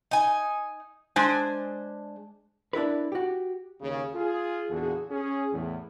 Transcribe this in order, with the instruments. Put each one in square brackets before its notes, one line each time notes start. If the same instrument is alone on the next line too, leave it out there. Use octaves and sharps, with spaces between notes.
[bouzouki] D#4 G#5
[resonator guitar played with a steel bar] G#3 D4 C5 G#5
[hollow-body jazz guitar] D4 E4 A#4 B4
F#4 G4
[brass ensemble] D#2 C#3
F4 G#4
E2 A#2 D3 F4 F#4 G#4
C#4 G#4
E2 A2